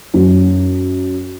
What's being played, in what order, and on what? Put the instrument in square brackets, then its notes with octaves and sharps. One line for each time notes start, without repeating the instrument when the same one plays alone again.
[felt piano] F#2 F#3